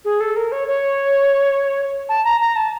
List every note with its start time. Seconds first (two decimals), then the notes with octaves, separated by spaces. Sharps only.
0.05 G#4
0.20 A4
0.36 A#4
0.52 C#5
0.68 C#5
2.09 A5
2.25 A#5
2.41 A#5
2.56 A5